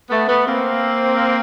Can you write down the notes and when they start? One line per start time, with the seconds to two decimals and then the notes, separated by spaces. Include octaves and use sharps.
0.09 A3 B3
0.27 A3 B3
0.46 A#3 C4